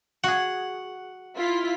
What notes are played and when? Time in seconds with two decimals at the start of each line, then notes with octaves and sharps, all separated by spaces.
0.24 F#4 G#4 F#5
1.37 E4 F4 B6